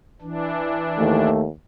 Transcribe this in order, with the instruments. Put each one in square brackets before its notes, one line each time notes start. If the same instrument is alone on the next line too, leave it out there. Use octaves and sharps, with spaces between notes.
[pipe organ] E3 D4
[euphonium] D#2 [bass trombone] A3